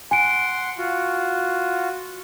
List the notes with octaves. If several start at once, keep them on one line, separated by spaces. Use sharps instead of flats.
F#5 G#5 C6 D7
F4 F#4